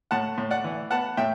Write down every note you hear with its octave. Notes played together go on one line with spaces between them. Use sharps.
A2 F#5 A5
A2
D5 F#5
E3
B3 F#5 A5
A2 E5 G5